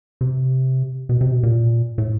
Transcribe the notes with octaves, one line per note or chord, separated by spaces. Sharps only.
C3
B2
C3
B2
A#2
A2